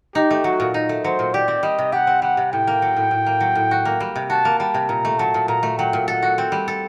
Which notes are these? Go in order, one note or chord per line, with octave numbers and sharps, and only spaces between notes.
D#4 G4
A3
F#3 F#4
A#2
D#4
A3
F#3 C5
A#2
G4 D5
C4
G3 D#5
C3
G4 F#5
C4
G3 F#5
C3
A2 G5
A#3
F#3
A2
A2
A#3
F#3
A2
F#4
A#3
G3
C3
F#4 A5
A#3
G3 A5
C3
A#2 A#5
A3
F#3 A5
A#2
A#2 A#5
A3
F#3 G5
A#2
A4 F#5
F#4
C4
G3
A4